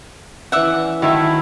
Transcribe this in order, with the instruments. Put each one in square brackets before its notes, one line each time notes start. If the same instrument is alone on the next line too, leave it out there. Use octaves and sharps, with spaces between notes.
[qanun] E3 C#4 [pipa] D5 E5 F#5
[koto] D#3 A3 [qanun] F#3 C#5 F5 [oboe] E4